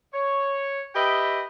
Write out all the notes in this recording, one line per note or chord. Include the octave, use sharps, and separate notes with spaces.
C#5
G4 B4 D#5 E5 G5